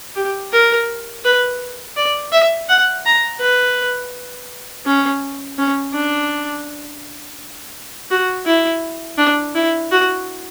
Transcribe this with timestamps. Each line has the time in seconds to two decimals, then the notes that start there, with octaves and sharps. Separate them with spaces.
0.16 G4
0.52 A#4
1.24 B4
1.96 D5
2.32 E5
2.69 F#5
3.05 A#5
3.40 B4
4.86 C#4
5.58 C#4
5.93 D4
8.11 F#4
8.46 E4
9.18 D4
9.55 E4
9.91 F#4